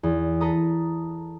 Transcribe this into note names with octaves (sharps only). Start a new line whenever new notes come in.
E2
A4 B4 A#5 D#6